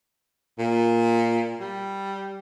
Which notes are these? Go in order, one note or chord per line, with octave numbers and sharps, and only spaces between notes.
A#2
G3